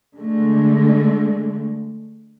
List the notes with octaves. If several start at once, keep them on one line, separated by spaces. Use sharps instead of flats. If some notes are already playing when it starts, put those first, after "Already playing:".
D3 G#3 A3